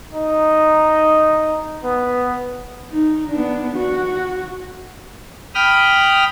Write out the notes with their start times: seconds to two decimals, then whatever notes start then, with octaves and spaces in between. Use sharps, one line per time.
0.13 D#4
1.84 B3
2.90 D#4
3.29 B3 D4
3.75 F#4
5.55 G5 B5 D#6 F6